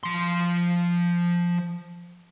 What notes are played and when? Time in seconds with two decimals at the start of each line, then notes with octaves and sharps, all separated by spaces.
0.03 F3 C6